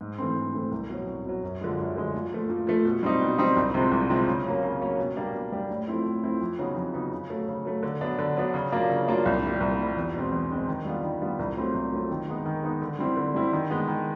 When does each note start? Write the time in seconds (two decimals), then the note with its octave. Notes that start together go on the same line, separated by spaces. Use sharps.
0.01 G#2
0.18 E3 A3 C4
0.36 G#2
0.54 E3 A3 C4
0.71 C2
0.89 B2 F#3
1.07 C2
1.25 B2 F#3
1.43 F#2
1.61 D3 F3 G#3
1.79 F#2
1.96 D3 F3 G#3
2.14 A#2
2.32 F3 A3
2.49 A#2
2.67 F3 A3
2.85 B2
3.03 G3 C4 D#4
3.21 B2
3.38 G3 C4 D#4
3.56 C2
3.74 C3 F3 G#3 C4
3.91 C2
4.09 C3 F3 G#3 C4
4.27 C#3
4.45 F#3 A#3 C#4
4.63 C#3
4.81 F#3 A#3 C#4
4.98 B2
5.16 G3 A#3 D4 G4
5.34 B2
5.52 G3 A#3 D4 G4
5.70 A2
5.87 F3 A3 C4 E4
6.05 A2
6.23 F3 A3 C4 E4
6.41 F2
6.59 C#3 F#3 B3 D#4
6.76 F2
6.94 C#3 F#3 B3 D#4
7.12 C#3
7.30 F#3 A3
7.48 C#3
7.65 F#3 A3
7.83 D3
8.01 F#3 B3 D4
8.19 D3
8.36 F#3 B3 D4
8.54 C#3
8.72 F#3 A#3 D4 F4
8.90 C#3
9.08 F#3 A#3 D4 F4
9.25 C2
9.43 A#2 G3
9.60 C2
9.79 A#2 G3
9.97 E2
10.14 B2 G#3 C4
10.32 E2
10.50 B2 G#3 C4
10.67 D#3
10.85 G3 B3 D4 F4
11.03 D#3
11.21 G3 B3 D4 F4
11.39 C2
11.57 A#2 F#3 A3 C4
11.74 C2
11.92 A#2 F#3 A3 C4
12.10 D#3
12.28 G#3 B3 D#4
12.46 D#3
12.63 G#3 B3 D#4
12.82 D3
12.99 G3 C4 E4
13.17 D3
13.34 G3 C4 E4
13.53 D#3
13.70 G#3 B3
13.88 D#3